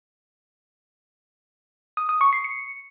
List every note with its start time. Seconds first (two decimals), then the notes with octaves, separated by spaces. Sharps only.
1.97 D#6
2.09 D#6
2.21 C#6
2.33 C7
2.44 C#7